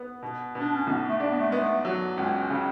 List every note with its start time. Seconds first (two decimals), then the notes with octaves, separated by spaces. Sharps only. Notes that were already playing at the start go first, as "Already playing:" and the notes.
Already playing: B3
0.23 B2
0.55 B2 D4
0.74 C#4
0.87 B1 B3
1.09 A3
1.20 D4
1.30 B3
1.39 A3
1.49 G#3 B3
1.57 A3
1.85 F#3
2.17 C#2 C#4
2.50 C#3